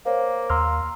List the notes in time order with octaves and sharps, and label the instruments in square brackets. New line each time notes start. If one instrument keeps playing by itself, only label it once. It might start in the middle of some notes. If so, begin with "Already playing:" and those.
[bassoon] A#3 [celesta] C5 C#5
[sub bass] D#2 [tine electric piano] A#5 C6 F6 [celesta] E6